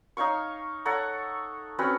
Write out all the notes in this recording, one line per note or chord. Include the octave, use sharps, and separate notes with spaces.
D#4 C#5 F5 C#6
A4 C#5 F#5 A#5
C4 C#4 F#4 B4